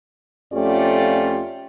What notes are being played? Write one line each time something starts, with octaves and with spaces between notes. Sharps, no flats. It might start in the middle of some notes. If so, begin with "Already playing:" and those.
F2 A3 C#4 F4 G4 D5